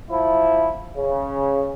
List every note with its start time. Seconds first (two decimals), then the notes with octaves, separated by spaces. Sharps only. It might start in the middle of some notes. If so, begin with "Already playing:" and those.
0.11 F3 E4
0.97 C#3